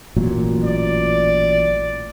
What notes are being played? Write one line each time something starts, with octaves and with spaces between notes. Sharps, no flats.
A1 A#2 F#3
D5